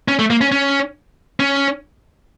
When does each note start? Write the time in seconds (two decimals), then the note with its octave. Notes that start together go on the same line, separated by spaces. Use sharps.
0.08 C#4
0.19 A3
0.30 A#3
0.41 C#4
0.52 C#4
1.40 C#4